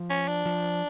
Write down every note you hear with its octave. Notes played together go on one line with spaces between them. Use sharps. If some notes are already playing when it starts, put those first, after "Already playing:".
Already playing: F3
C#4
D4
F3